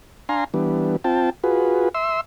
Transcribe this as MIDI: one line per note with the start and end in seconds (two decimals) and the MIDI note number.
0.29 0.44 62
0.29 0.44 77
0.29 0.44 80
0.29 0.44 82
0.29 0.44 84
0.54 0.96 52
0.54 0.96 55
0.54 0.96 59
0.54 0.96 62
1.04 1.30 60
1.04 1.30 65
1.04 1.30 79
1.04 1.30 81
1.44 1.89 65
1.44 1.89 66
1.44 1.89 68
1.44 1.89 71
1.95 2.21 76
1.95 2.21 84
1.95 2.21 88